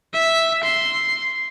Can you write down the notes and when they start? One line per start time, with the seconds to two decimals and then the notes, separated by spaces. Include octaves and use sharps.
0.14 E5
0.64 C6